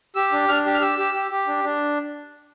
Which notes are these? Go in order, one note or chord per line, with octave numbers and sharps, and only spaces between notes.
G4 E6
D4
D4 F6
G4
F6
G4 E6
G4
G4
G4
D4
D4